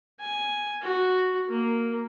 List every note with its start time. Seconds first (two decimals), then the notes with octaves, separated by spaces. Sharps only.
0.20 G#5
0.82 F#4
1.48 A#3